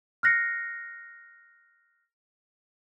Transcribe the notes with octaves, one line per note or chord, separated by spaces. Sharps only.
F6 F#6 A#6 C7 C#7